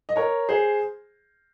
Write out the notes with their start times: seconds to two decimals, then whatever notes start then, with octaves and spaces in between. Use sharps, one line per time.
0.09 D#5
0.16 A#4 C#5
0.49 G#4 C5